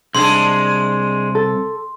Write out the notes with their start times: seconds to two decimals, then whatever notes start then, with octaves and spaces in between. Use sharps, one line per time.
0.15 C2 G#3 D4 G#4 C6
1.35 A4